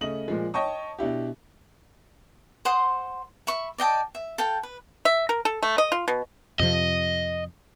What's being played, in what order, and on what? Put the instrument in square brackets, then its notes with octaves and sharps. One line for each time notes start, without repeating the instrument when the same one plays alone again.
[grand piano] C#3 A3 C#4 D#5 F#7
A#2 F3 G#3
C#5 D#5 G5 A5 C#6 D#6
B2 D4 E4 G4
[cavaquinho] C5 F#5 C6 D#6
E5 B5 C#6
D5 D#5 G5 A5
E5
A4 F5 G5
B4
[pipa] E5
A#4
A4
A3
D#5
F4
B2
[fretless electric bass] F2 C3 F3 [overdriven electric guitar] D#5